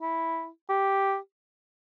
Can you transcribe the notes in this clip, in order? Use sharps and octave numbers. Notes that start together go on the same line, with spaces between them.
E4
G4